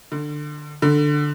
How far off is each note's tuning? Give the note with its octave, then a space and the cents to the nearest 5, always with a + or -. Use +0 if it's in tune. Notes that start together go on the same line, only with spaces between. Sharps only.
D3 +20
D3 +10